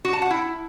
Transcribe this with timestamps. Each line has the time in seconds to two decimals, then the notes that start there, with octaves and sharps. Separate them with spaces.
0.05 F#4
0.13 A5
0.22 F#5
0.30 E4